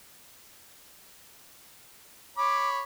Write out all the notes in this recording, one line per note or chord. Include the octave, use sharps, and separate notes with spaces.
C#5 B5 D6